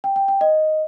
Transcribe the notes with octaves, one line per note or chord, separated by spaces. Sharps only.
G5
G5
G5
D#5